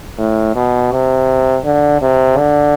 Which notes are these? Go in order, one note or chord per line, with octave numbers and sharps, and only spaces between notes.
A2
B2
C3
D3
C3
D3